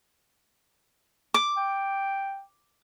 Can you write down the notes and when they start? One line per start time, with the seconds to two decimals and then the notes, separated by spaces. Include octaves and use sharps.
1.34 D6
1.57 G5